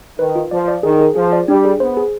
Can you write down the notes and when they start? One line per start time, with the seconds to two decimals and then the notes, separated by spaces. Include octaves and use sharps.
0.19 D#3 B4
0.35 F4
0.51 F3 D5
0.68 D5
0.83 D#3 G#4
1.00 G#4
1.15 F3 G#4
1.33 D5
1.48 G3 D4
1.65 G#4
1.80 B3 C5
1.97 G#4